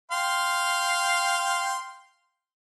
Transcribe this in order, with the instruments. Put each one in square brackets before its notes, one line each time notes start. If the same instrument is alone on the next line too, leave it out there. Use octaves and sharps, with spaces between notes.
[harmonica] F5 G5 C6